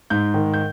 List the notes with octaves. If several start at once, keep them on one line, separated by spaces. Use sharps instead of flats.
G#2 G6
D#3
G6